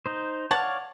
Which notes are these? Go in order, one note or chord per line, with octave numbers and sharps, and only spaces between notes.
D#4 C5
C#5 D5 F5 F#5 A5